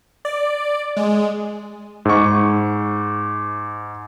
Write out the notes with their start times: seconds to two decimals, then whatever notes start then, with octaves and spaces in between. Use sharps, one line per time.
0.25 D5
0.97 G#3
2.05 G#2 C#6